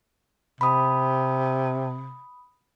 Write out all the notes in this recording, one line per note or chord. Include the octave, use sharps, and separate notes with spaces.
C3 B5 D#6